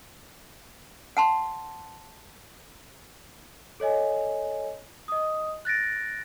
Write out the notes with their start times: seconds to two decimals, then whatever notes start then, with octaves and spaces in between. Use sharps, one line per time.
1.17 F#5 A5 C6
3.80 A4 C#5 D#5 G#5
5.08 D#5 D#6
5.65 F#6 A6 A#6 D7